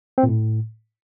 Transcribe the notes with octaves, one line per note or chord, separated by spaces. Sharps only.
C4
A#2
A2